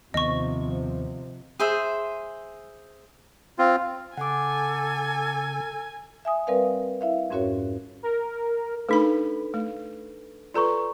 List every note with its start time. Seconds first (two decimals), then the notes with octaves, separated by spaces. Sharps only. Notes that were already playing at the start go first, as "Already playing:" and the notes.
0.14 D#2 C3 D#3 F3 B3 D#5 C#6
1.60 G#4 C5 E5
3.59 C4 F4
4.17 C#3 A4 F#5 G#5 D6
6.25 E5 G#5 D#6
6.47 G3 C4 A#4 B4 D5 F5
7.01 E4 E5 F5
7.30 F2 G#2 C#4 F#4 A#4 C#5
8.03 A#4
8.89 A3 D4 D#4 A4 B4 B5
9.54 A3
10.54 F4 A4 B4 D5 A#5 C#6